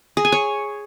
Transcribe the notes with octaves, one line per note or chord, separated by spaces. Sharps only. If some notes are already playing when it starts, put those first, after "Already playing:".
G#4
G#5
C#5